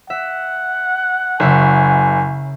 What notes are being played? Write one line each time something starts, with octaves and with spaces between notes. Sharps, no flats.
E5 F#5
F#1 C#3 E5 G#5 C#6